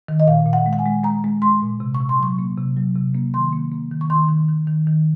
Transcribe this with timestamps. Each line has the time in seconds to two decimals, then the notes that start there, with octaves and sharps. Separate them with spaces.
0.08 D#3
0.20 D#5
0.27 A#2 F5
0.46 A#2
0.53 F#5
0.66 G#3
0.73 F#5
0.79 G#5
0.86 G#3
1.04 G#3 A#5
1.24 G#3
1.42 G#3 C6
1.62 A#2
1.80 C3
1.95 C#6
2.00 C3
2.09 C6
2.20 F#3 C#6
2.39 A#3
2.58 C3
2.77 F#3
2.96 C3
3.15 A#3
3.34 D#3 C6
3.53 A#3
3.71 A#3
3.92 D#3
4.01 C#6
4.10 D#3 C6
4.29 D#3
4.48 D#3
4.67 D#3
4.87 D#3